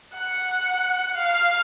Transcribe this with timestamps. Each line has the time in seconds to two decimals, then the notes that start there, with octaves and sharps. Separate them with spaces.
0.15 F#5
1.15 F5